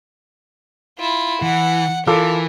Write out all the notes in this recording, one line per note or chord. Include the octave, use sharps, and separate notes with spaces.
E4 F4
E3 F#5
E3 F4 A4 A#4 D6